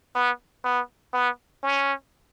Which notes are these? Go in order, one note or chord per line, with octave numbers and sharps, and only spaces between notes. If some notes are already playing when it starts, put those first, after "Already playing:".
B3
B3
B3
C#4